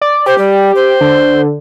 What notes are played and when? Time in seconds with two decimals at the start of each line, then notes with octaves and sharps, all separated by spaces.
0.01 D5
0.26 G4 C5
0.38 G3
0.75 C5
1.01 D3